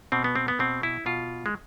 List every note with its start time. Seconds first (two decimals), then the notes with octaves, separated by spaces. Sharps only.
0.12 B2 C4
0.24 B3
0.35 C4
0.48 B3
0.59 B2 C4
0.83 E4
1.06 B2 F4
1.46 G#3